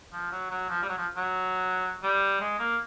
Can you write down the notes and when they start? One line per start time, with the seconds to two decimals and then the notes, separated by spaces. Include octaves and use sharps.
0.13 F3
0.31 F#3
0.50 F#3
0.69 F3
0.82 G3
0.89 F#3
0.97 F3
1.17 F#3
2.03 G3
2.41 G#3
2.59 A#3